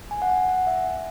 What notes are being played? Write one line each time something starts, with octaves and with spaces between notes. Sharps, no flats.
G#5
F#5
G#5
F#5
E5